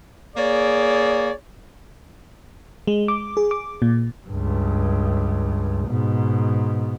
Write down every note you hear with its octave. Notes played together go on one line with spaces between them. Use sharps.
A#3 G#4 C#5 D5
G#3
D6
G#4
D6
A#2
C#2 G2
G#2 B2